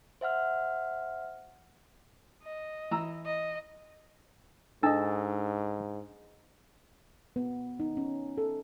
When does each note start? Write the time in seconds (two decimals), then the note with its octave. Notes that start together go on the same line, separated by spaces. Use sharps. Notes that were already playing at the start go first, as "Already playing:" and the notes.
0.21 C5 E5 F#5 F6
2.43 D#5
2.91 E3 A#5 E6
3.26 D#5
4.83 G#2 D4 A4 D#5
7.36 B3
7.80 D#4
7.97 C#4
8.38 A4